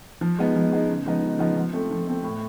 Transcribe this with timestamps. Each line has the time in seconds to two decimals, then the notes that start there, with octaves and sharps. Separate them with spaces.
0.21 F3
0.39 G#3 B3 D#4
0.56 F3
0.72 G#3 B3 D#4
0.89 C#3
1.06 F3 G#3 B3 D#4
1.23 C#3
1.39 F3 G#3 B3 D#4
1.56 F3
1.73 A3 C4
1.91 F3
2.07 A3 C4
2.24 A2